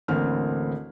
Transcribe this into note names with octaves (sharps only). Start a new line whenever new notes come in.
A1 D2 A#3 C4 F6